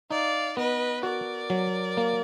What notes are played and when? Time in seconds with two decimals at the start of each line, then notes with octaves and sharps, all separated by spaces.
0.11 D#4 D5 F5
0.57 B3 B4 D#5
1.03 F#4 A#4 D5
1.50 F#3
1.97 A#3